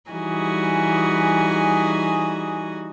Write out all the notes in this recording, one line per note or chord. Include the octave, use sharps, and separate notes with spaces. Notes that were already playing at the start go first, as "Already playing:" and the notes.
E3 G3 D#4 F#4 G#4 G#5